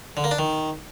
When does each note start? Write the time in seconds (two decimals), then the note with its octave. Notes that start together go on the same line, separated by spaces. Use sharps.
0.17 D3
0.24 A#3
0.31 D4
0.39 D#3